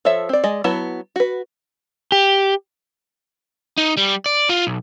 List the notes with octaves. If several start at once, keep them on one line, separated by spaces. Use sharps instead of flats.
F3 A4 C#5 E5
C4 D5
G#3 D5 D#5
F#3 B3 E4 A5
F#4 B4
G4
D#4
G3
D5
F4
B1